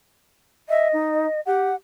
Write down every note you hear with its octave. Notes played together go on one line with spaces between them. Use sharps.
D#5 E5
D#4
G4 F#5